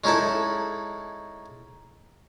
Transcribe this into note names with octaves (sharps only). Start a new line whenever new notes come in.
G#3 C#4 D#4 E4 A4